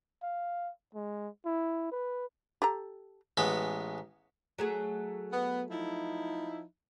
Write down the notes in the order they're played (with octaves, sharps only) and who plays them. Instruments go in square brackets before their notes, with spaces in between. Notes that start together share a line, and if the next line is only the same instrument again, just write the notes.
[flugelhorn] F5
G#3
E4
B4
[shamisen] G4 A4 A#5
[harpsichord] A1 G#3 B3 B5
[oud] F#3 A3 G#4
[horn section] B3
F3 D#4 E4